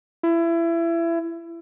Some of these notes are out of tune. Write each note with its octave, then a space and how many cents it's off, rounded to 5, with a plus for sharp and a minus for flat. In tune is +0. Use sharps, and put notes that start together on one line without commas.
E4 +25